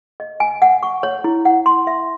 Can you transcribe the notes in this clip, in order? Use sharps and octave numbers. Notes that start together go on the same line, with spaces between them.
D#5
G#5
F#5
C#6
C#5
E4
F#5
C6
E5